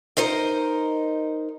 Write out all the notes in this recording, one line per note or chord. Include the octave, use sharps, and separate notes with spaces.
D#4 A#4 C5 D#5